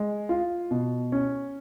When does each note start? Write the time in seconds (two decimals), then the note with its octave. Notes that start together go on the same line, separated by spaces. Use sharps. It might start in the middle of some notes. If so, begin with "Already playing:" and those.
Already playing: G#3
0.29 F4
0.71 B2
1.12 C#4